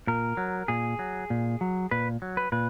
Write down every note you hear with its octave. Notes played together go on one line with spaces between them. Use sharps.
A#2 A#4
F#3
A#2 G#4
F#3
A#2
F#3
A#2 B4
F#3
B4
A#2 B4